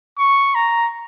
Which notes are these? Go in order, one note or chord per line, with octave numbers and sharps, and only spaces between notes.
C#6
A#5